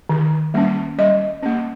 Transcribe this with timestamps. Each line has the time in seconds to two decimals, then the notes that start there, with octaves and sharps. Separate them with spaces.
0.09 D#3
0.54 G3 A#3 C#4
0.98 G3 D#5
1.43 A#3 C#4